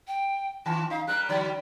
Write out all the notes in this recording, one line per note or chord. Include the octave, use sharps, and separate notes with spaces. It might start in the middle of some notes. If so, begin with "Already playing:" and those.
G5
D#3 F4 A5
D#4 F5
G3 A#4 F#6
D3 F#3 G3 D5